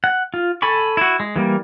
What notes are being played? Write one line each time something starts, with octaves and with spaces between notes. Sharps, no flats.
F#5
F4
A4 G#5 B5 C#6
E4 F#4
G#3
E3 G3 A#3